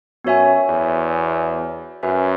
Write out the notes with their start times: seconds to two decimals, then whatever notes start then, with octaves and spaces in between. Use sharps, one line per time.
0.24 F#2 B3 F#4 C#5 E5 G#5
0.69 E2
2.03 F#2 F#4 B4 E5 G#5